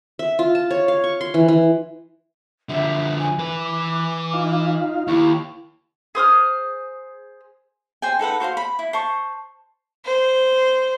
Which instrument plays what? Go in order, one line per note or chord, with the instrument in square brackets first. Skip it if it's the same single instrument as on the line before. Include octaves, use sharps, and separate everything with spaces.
[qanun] E5
F4
A5
C#5
F5
C#6
C6
E3
E3
[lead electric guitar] D3 F3 [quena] E5
[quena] G#5
[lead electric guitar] E3 B4 [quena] D6
[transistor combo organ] D#4 F4 F5
[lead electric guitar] D#2 [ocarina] E4 [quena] C#6
[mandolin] G#4 C5 D#6 F6
[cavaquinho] C5 G5 G#5
D#4 A4 B4 F#5
F#4 C5 F5 C6
B5
E4
C5 A5 C#6
[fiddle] C5